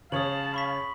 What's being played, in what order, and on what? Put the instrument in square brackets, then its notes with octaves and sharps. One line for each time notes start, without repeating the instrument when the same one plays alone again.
[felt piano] C#3 C#5 [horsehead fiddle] F5 A5 [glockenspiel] D#6 F#7
[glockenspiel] B5 C#6 B6